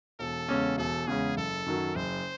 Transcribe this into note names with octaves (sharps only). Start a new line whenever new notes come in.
E1 A4
E2 C#3 G#3 C#4
E1 A4
E2 C#3 G#3 C#4 G#4
F#1 A4
F#2 D#3 F#3
F#1 C5